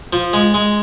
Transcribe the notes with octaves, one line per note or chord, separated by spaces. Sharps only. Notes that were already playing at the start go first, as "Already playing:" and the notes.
F3
G#3
G#3